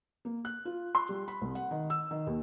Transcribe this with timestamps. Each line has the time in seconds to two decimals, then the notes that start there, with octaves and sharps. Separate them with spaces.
0.25 A#3
0.45 F#6
0.65 F4
0.95 C6
1.09 G3
1.28 B5
1.41 C2
1.55 F#5
1.71 D#3
1.90 E6
2.11 D#3
2.27 D#2